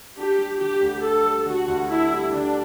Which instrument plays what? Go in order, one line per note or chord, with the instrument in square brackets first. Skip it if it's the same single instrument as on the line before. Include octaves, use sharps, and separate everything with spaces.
[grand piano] D4 [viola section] G4
[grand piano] G3
[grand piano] D3 [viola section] G4
[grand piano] D2
[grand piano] D4 [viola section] A4
[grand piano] G3
[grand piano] D3 [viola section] F#4
[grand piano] D2
[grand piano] D4 [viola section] E4
[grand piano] G3
[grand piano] D3 [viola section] D4